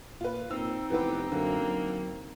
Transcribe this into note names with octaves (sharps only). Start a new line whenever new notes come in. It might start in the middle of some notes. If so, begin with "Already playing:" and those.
A#2 F4 B4
A#2 C4 D#4 E6
F1 E3 B3 G4 B4
F#2 D3 A#3
F#3